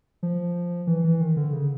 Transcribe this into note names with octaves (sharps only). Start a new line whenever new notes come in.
F3
E3
E3
D#3
D3
C#3